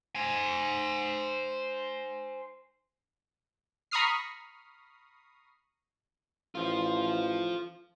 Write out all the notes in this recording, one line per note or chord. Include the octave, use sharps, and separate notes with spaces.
C5 G#5
A#5 B5 C#6 D#6 F6 C7
A1 F4 C5